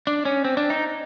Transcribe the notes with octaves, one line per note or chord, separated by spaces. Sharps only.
D4
C#4
C4
D4
D#4